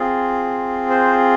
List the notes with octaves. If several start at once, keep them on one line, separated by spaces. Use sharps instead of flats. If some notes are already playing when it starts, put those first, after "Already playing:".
Already playing: C4 F4 G#4
C5